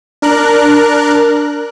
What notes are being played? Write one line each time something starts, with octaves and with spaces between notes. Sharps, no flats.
D4 A#4 F#6